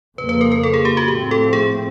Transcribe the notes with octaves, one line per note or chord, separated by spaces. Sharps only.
F2 C#3 F3 A#3 B4
B4
A#4
A#4
A4
G#4
G4
F#4
A2 F3 A3 C4 G4
A4
G#4